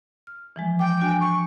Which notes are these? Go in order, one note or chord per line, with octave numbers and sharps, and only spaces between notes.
F6
E3 F3 G#3
G5 D6
D4 F#4 G#5
C#6